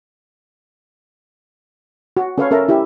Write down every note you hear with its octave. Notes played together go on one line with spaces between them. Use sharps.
F#4
C#4 A4 B4 C#5 F5 C#6
C#4 A4 A#4 E5 A5 A#5
E4 G4 E5